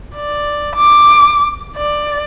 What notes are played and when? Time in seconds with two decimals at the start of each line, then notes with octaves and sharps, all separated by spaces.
0.15 D5
0.75 D6
1.77 D5